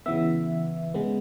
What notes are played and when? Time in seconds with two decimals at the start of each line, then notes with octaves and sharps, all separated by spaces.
0.06 C#3 E3 B3 E5
0.94 C#3 G#3 B3